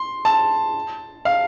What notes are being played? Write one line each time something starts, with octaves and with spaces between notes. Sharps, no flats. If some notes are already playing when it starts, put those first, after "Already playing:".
Already playing: C6
A5
F5